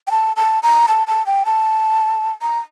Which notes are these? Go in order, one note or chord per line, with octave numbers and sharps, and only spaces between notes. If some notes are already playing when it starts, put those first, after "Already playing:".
G5
A5
A5
A#5
A5
A5
G5
A5
A#5